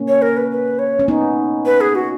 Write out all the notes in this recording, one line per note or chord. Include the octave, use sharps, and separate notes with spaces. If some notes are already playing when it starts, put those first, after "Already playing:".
Already playing: A#3 C#4
C#5
A#4
B4
B4
C#5
C#4
B3 D#4
B4
G#4
F#4